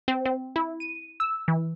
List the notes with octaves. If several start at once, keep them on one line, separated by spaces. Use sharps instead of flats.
C4
C4
E4
D#7
E6
E3